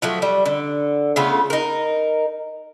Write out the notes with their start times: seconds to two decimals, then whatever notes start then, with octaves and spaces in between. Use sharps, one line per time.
0.02 F3 F#3 A3
0.22 G3
0.46 D3
1.16 C#3 A3 B3 F4
1.50 D#4 A#4